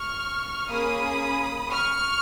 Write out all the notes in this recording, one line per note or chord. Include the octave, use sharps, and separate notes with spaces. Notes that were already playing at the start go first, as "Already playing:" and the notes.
Already playing: C#6 F6
A#3 C#4 G#4 B5 D#6
C#6 F6